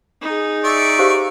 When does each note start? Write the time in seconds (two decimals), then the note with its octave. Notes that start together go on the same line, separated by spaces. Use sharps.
0.22 D#4 G#4
0.64 D5 E5 C#6
0.99 G4 C5 F5